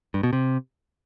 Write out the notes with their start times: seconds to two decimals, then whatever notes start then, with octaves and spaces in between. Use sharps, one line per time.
0.14 G2
0.23 B2
0.33 C3